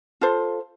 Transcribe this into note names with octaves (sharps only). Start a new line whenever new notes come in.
F4 A4 C5